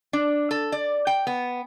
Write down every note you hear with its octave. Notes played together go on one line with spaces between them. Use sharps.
D4
A4
D5
G5
B3